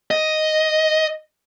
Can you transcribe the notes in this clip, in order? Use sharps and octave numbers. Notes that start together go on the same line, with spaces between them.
D#5